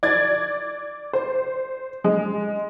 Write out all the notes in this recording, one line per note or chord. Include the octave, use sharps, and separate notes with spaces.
D5 G#6 A6
C5
G#3